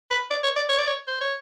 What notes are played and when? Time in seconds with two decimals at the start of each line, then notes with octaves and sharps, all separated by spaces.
0.11 B4
0.31 D5
0.44 C#5
0.56 D5
0.69 C#5
0.78 D5
0.87 C#5
1.08 C5
1.21 C#5